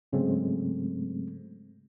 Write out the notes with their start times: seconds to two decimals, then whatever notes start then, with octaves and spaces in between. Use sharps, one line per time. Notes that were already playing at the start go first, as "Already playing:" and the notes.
0.13 G#2 C#3 F#3 G#3 A3 C4